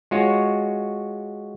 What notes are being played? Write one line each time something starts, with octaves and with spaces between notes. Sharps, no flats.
G#3 F4 F#4 C#5